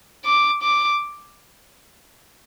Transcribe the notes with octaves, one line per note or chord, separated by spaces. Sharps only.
D6
D6